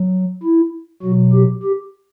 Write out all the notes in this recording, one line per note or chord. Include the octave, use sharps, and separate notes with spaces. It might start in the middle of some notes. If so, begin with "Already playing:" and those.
Already playing: F#3
E4
B2 F#3 F#4
G4
G4